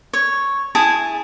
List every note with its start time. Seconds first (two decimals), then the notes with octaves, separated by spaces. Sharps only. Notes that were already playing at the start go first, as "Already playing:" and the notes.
0.13 C#5
0.75 E4 G#4 A5